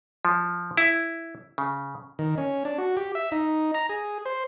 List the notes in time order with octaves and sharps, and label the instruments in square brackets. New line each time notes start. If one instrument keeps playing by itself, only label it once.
[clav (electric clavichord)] F3
E4
C#3
[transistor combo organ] D#3
C#4
D4
F#4
G4
E5
D#4
A#5
G#4
C5